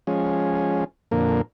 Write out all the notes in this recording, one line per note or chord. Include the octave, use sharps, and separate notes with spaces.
F3 G#3 C#4
F2 A#2 D3 A#3